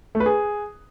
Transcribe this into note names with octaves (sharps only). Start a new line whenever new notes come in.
A3
B4
G#4